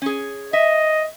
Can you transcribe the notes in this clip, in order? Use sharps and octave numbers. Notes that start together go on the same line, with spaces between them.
C#4 G#4
D#5 E5